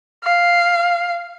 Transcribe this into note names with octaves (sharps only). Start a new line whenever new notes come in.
F5